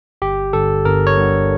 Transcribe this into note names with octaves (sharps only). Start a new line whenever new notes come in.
G1 G4
G2 D3 A4
G1 A#4
C#5
G2 D3